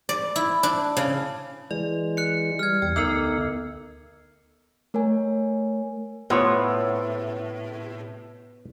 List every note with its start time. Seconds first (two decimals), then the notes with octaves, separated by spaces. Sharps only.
0.09 D5
0.36 E4
0.63 D4
0.97 C#3
1.71 E3 G#3 D5
2.17 F#6 C#7
2.59 G3 F6 G#6
2.82 E2 G5
2.96 D2 B3 D#4 A4 A#4 E6
4.94 A3 A#4 C#5 G#5
6.30 A2 B3 F4 C5 C#5